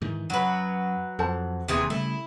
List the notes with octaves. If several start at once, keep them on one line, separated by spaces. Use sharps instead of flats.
G#2 D#3 E3
F#2 F#3 B4
F2 A4 C5 A5
D1 D#2 C3 E3 G#4
C#3 G3 A3 E4